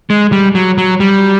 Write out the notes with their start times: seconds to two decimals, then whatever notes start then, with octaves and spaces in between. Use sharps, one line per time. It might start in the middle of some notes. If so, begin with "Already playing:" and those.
0.10 G#3
0.32 G3
0.55 F#3
0.78 F#3
1.00 G3